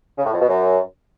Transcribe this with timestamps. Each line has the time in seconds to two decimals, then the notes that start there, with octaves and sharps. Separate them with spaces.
0.18 C#3
0.26 A2
0.33 F2
0.41 B2
0.49 F#2